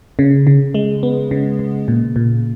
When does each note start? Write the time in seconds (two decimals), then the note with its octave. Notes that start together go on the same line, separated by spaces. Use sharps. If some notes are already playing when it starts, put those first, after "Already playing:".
0.19 C#3
0.47 C#3
0.74 G#3
1.03 B3
1.31 C#3
1.59 C#3
1.88 A#2
2.16 A#2